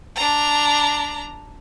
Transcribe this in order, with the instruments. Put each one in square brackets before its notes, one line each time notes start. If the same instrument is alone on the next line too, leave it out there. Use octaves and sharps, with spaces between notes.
[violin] D4 A#5